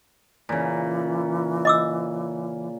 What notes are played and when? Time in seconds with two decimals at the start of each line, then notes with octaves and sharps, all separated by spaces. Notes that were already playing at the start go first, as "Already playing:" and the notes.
0.49 A#2 C#3 E3
1.65 D#5 D6 E6